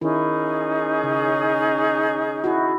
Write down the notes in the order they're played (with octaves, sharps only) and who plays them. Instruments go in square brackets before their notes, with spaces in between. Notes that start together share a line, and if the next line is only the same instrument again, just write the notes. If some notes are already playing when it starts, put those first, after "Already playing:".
[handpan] D#3 E4 [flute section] C#4 D#4 G#4
[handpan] C#3
E4 F#4